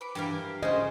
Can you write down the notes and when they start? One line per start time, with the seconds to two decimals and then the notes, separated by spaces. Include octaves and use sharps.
0.01 B4 D6
0.15 G2 E3 G4 A#4 F5
0.63 C#3 C#4 F4 G#4 C5 D#5